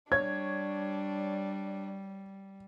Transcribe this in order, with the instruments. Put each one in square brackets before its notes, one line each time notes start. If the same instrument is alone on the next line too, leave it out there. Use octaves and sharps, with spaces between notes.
[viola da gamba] G3 [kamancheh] D4 [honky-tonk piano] C#5 [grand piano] G#6